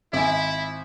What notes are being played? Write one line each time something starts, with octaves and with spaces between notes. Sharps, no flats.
G#1 E4 G#5